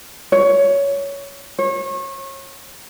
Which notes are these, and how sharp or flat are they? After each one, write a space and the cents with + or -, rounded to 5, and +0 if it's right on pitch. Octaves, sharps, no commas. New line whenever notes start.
C#5 +15
C#5 -30